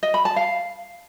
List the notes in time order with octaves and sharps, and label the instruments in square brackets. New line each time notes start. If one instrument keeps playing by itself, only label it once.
[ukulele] D#5
B5
A5
F5